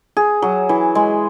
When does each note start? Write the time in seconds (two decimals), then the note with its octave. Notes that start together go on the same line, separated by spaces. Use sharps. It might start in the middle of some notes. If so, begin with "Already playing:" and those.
0.17 G#4
0.42 F#3
0.69 E3
0.95 G#3